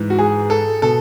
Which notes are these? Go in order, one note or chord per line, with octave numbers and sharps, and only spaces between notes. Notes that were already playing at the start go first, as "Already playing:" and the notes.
Already playing: G#2 E3
F#4
G#4
A4
B2 A4